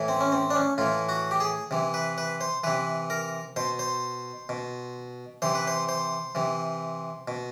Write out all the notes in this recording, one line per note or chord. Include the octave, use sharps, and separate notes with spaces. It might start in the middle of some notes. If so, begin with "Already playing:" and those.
Already playing: A2 E3
C4
C#4
C4
D4
C#4
A2 E3 F4
F#4
G4
G#4
C3 E3
B4
B4
C5
C3 E3 B4
A#4
B2 C5
C5
B2
C3 E3 C5
B4
C5
C5
C3 E3
B2